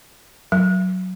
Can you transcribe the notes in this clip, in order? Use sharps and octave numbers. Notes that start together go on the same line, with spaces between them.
F#3